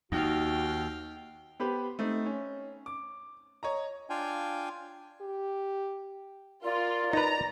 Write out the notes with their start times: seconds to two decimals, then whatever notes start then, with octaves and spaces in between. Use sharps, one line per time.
0.12 D#2 D#4 F#4 F5 G5
1.60 B3 G4 B4 C5
1.99 A3 C4 D#4
2.26 C#4
2.86 D6
3.63 C#5 D#5 A#5
4.10 D4 F4 F5 G5 G#5
5.21 G4
6.64 F4 A#4 D5
7.13 D#4 B4 A#5